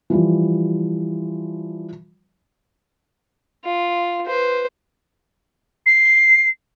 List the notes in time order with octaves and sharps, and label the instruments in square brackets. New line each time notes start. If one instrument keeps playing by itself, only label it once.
[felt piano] E3 F3 G3
[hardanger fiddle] F4
B4 C5
[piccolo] C7